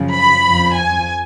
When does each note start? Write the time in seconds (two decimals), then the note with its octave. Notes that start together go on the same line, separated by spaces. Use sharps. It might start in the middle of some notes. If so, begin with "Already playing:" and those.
Already playing: F#2 C#3 F3
0.14 B5
0.46 F2 F3
0.77 G#5